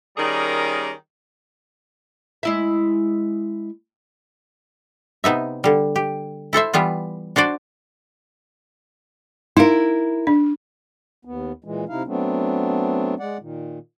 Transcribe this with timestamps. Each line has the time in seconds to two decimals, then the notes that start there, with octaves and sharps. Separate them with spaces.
0.18 D#3 G3 C#4 G#4 A#4 D5
2.43 G#3 E4 E5
5.24 C3 B3 D#4 E5
5.64 D3 G3
5.96 G4
6.53 E4 A4 C5 E5
6.73 E3 G3 B3 F4
7.36 D4 F#4 C5 D5
9.57 D#4 E4 A#4 F5
10.27 D4
11.25 D#2 B3
11.64 A#2 E3 G#3
11.89 C3 D#4 E4 F5
12.07 F#3 A3 B3 C4 D4
13.20 G#3 D5 F#5
13.40 A#2 D#3